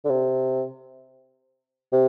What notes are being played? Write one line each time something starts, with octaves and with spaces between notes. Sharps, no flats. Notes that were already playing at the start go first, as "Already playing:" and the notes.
D3
C3
C3